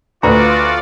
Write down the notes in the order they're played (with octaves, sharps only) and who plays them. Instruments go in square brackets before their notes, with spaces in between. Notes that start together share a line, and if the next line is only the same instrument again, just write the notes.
[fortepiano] D2 [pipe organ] F4 D5 [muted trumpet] F#4 [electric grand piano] B4 A#5